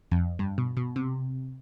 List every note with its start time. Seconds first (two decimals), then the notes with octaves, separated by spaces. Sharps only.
0.11 F2
0.39 G2
0.58 B2
0.77 B2
0.96 C3